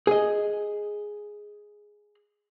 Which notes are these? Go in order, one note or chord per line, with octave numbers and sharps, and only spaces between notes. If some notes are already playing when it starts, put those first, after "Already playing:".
G#4 D#5